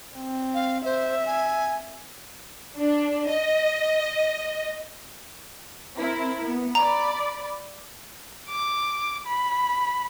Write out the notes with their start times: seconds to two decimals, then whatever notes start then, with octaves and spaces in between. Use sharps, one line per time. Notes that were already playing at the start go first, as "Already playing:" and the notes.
0.16 C4
0.54 F5
0.85 C5 E5
1.26 G#5
2.77 D4
3.29 D#5
5.97 C4 E4 A#4
6.45 B3
6.75 D5 A#5 B5
8.49 D6
9.27 B5